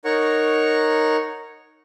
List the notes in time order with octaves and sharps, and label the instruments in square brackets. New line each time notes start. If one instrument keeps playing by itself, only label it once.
[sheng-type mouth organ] D#4 A#4 C#5 F#5 C#6